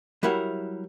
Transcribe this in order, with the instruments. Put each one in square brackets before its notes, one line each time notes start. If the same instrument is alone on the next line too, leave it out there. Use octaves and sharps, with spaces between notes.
[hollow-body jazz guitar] F#3 G3 E4 A#4 F#5